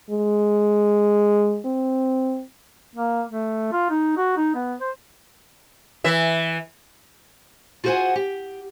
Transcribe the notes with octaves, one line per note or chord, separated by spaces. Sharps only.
G#3
C4
A#3
A3
F4
D#4
F#4
D#4
B3
C5
E3 E5
F4 F#4 G#4 C5 F#5 G#5
G4